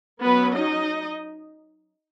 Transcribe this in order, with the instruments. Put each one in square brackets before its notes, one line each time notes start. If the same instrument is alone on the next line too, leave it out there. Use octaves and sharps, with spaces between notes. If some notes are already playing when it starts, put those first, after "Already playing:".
[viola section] F#3 B3 C#4 B4
D#4 D#5